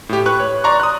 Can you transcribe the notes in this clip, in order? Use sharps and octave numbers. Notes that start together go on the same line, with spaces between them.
A2 G4
B4 C#6 F#6
C#5
D5 A#5 C6 C#6
D#6 F#6